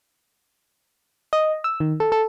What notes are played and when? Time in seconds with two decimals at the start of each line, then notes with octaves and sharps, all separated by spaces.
1.33 D#5
1.64 E6
1.80 D#3
2.00 A4
2.12 A4